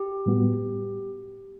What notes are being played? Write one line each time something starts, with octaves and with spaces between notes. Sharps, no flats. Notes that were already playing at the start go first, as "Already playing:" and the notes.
Already playing: G4
A2 G3 B3 F#4